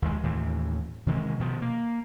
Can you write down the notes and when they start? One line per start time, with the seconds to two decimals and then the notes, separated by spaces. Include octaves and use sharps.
0.02 D#2 E3 G#3
0.23 D#2 A2 E3
1.06 C3 D#3 E3 G#3
1.40 B2 D#3 F3
1.62 A#3